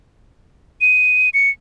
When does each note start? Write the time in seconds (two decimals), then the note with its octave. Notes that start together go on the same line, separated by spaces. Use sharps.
0.81 D#7
1.34 C#7